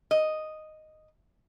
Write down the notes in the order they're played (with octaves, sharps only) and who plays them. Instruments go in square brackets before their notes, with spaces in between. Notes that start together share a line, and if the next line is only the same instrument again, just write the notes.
[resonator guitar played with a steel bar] D#5